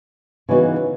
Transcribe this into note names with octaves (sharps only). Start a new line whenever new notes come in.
C#3 E3 B3 D#4 F#4